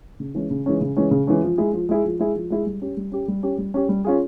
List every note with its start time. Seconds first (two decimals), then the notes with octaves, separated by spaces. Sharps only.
0.20 C#3
0.35 E3 G#3 C#4
0.51 C#3
0.66 E3 G#3 C#4
0.81 C#3
0.97 E3 G#3 C#4
1.11 C#3
1.27 E3 G#3 C#4
1.43 F3
1.58 G#3 E4 G#4
1.73 F3
1.89 G#3 E4 G#4
2.04 F3
2.19 G#3 E4 G#4
2.35 F3
2.50 G#3 E4 G#4
2.66 G3
2.82 C#4 G4
2.97 G3
3.12 C#4 G4
3.28 G3
3.43 C#4 G4
3.58 G3
3.74 C#4 G4
3.89 G3
4.04 C#4 F4 G#4